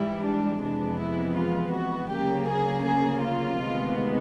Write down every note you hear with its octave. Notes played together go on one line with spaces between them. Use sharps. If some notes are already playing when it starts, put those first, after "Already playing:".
Already playing: G#2 E3 G3 E4
D4
F2 C3 E3 G#3 B3 D4
E4
F4
F#4
D2 C#3 F#3 A#3 G4
G#4
G#4
F4
D2 C3 D#3 G#3 B3